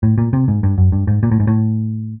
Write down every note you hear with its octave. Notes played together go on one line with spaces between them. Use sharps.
A2
A#2
C3
G#2
G2
F#2
G2
G#2
A#2
A2
G#2
A2